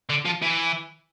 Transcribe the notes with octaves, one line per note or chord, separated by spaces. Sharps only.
D3
F3
E3